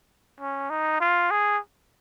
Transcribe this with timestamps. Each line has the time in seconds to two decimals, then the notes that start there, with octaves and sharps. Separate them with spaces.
0.40 C#4
0.70 D#4
1.00 F4
1.30 G#4